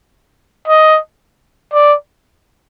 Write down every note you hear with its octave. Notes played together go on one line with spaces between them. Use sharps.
D#5
D5